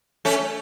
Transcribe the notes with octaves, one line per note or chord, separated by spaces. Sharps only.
A3 C#4